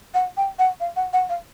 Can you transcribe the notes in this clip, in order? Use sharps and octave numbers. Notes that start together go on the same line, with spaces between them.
F#5
G5
F#5
F5
F#5
F#5
F5